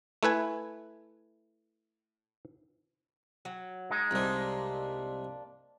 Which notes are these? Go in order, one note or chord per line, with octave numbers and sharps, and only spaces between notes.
A3 E4 B4 G#5
F#3
G#3 D#4
C2 C3 A#3 D4